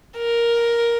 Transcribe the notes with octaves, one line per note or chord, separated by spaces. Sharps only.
A#4